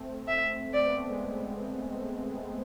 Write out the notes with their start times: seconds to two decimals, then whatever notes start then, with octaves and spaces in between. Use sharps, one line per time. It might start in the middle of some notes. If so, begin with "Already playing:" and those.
Already playing: A3 C4
0.28 E5
0.73 C4 D5
0.86 B3
0.97 A3
1.09 G#3 B3